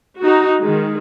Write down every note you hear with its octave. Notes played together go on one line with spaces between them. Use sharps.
D#4 F#4
D#3 G#3